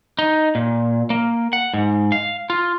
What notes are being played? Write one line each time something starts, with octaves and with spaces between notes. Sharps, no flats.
D#4
A#2
A#3
F#5
G#2
F5
F4